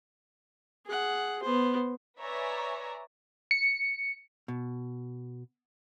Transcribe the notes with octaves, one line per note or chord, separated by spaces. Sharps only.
G#4 F#5
B3 C5
B4 C#5 D5 E5 G#5 A#5
C#7
B2